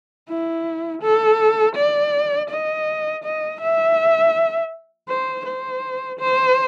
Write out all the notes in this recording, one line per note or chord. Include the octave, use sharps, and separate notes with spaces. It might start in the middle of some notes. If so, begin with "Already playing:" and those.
E4
A4
D5
D#5
D#5
E5
C5
C5
C5